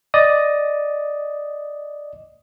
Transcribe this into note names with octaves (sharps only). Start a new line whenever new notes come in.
D5 D#5 D#6